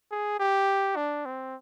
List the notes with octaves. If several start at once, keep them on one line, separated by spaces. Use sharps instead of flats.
G#4
G4
D4
C4